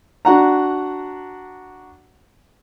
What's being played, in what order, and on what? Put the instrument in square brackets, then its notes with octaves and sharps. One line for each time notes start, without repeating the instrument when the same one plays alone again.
[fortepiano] D4 F#4 F#5 A#5